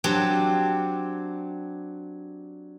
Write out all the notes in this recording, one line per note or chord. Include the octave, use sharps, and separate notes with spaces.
F#3 C4 D4 G4